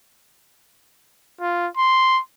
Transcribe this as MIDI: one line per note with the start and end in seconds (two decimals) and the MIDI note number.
1.41 1.68 65
1.77 2.21 84